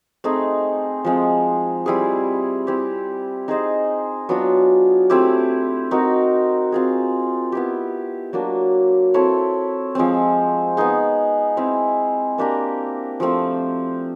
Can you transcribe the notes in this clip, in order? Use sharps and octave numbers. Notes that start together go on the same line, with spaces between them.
A3 C4 D#4 G#4
F3 G#3 C4
G3 C4 E4 G#4
C4 E4 G4
D#4 G#4 C5 D#5
F#3 B3 D4 F4
A3 C4 E4 G4
C4 D#4 F#4 A#4
C4 F4 G#4
B3 E4 G4
F#3 A#3 D4
C4 E4 A4 C#5
F3 G#3 C4
B3 D#4 G#4
G#3 C4 E4
A#3 D4 G4 A#4
F3 A3 C4